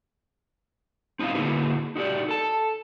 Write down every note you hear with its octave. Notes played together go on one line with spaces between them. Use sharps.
C4 D#4 E4 D#5 F5
D3 A#3 E4 F#4 G#4 B4
D#4 F#4 G4 D5
A4 A5